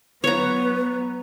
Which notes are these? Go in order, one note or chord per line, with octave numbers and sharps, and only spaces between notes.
F#3 B3 B4 C#5 A#5